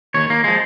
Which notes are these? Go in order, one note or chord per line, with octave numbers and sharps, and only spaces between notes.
D#2 D#3 C#5
A#3
F3 G#3